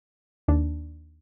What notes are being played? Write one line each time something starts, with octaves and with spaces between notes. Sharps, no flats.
D#2 D4